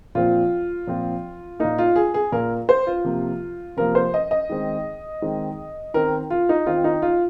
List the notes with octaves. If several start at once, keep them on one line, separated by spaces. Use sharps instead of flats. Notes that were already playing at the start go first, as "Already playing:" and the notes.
A#2 F3 C4 F4
A#2 F3 C4
A#2 A#3 D#4
F4
G#4
G#4
A#2 A#3 A#4
C5
F4
C3 F3 A#3
C3 F3 A#3 A#4
C5
D#5
D#5
D#3 G#3 C4
D#3 G#3 C4
D#3 C4 A#4
F4
D#4
D#3 C4 F4
D#4
F4